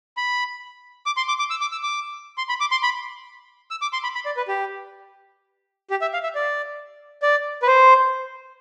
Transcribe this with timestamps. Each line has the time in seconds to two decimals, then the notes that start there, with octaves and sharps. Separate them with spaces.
0.17 B5
1.06 D6
1.17 C6
1.28 D6
1.39 D6
1.50 E6
1.61 D6
1.72 E6
1.83 D6
2.38 C6
2.49 B5
2.60 D6
2.71 C6
2.83 B5
3.71 E6
3.82 D6
3.93 C6
4.03 B5
4.15 B5
4.26 D5
4.37 B4
4.48 G4
5.90 G4
6.02 E5
6.13 F5
6.23 E5
6.35 D5
7.22 D5
7.62 B4
7.67 C5